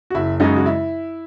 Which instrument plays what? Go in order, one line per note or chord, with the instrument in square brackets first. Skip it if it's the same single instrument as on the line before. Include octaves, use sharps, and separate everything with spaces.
[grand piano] F#4
F#1 E4
F#2 C#3 G#3 D#4
F#4
E4